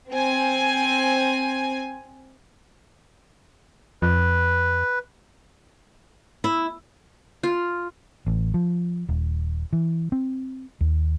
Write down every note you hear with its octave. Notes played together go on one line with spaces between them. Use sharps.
C4 G#5
F2 B4
E4
F4
A1
F3
D#1
E3
C4
D#2